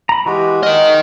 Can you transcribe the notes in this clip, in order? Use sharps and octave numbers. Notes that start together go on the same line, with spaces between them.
A#5 B5
E3 G#3 F#4 G4
A#4 D#5 F6